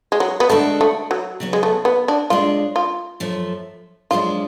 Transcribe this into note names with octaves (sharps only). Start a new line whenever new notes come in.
G#3
F#3
B3
D3 G#3 A3 D4 F#4 A4
A3
F#3
C#3 F#3 B3
G#3
A3
B3
D4
A2 G#3 D4 F4
F4
F#2 F3 A3
F#2 F3 G#3 B3 D4 F4